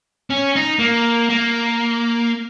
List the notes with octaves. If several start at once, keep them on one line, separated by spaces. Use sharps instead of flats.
C#4
D#4
A#3
A#3